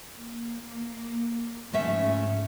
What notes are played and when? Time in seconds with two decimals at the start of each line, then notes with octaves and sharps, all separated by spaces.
0.17 A#3
1.73 G#2 C#3 F3 A3 C#4 E5